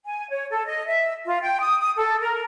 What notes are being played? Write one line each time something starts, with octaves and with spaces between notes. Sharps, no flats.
G#5
C#5
A4
D#5
E5
F4
G5
D#6
D#6
A4
A#4